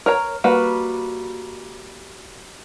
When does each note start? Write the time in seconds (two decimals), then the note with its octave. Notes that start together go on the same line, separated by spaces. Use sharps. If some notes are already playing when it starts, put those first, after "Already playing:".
0.06 A#4 C#5 A#5
0.44 G3 A#3 F#4 B4 F#5